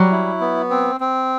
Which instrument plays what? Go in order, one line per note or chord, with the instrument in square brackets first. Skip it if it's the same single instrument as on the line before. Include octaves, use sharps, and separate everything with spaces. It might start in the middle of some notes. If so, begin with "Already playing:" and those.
Already playing: [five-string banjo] F#3 [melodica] G3
[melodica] E4
B3
C4
C4